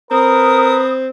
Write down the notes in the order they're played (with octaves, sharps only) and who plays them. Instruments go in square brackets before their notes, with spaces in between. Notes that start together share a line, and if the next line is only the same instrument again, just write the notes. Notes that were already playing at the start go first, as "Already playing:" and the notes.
[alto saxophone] C4 [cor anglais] A#4 [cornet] B4 [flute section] D#6